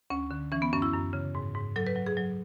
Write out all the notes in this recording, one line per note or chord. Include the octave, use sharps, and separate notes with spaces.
D2 C#4
D3
E3 C#4
B3
F#2 C#4
E4
F#2
C#3
G#2
G#2
F#3 A4
B4
F#3
G#4
F#3